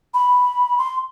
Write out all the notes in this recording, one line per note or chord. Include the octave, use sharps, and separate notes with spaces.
B5
C6